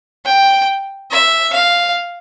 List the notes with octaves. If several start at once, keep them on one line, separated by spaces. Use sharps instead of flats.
G5
E5
F5